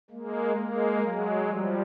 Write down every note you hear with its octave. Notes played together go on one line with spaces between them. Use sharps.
G#3 A#3
G#3 A#3
F#3 G#3
F3 G3